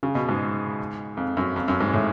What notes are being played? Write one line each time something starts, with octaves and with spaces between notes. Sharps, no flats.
C#3
B2
G#2
F2
F#2
F2
F#2
G#2
A2